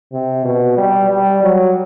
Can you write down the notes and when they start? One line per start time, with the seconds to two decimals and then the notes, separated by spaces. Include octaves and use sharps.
0.13 C3
0.45 B2
0.77 G3
1.10 G3
1.43 F#3